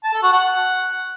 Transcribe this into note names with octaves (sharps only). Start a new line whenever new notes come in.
A5
A4
F#4
F#5